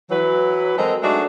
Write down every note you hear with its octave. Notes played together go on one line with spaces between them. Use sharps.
E3 F#3 B4
F#3 G#3 C4 A4 A#4 D#5
F#3 G#3 A3 D4 D#4 F#4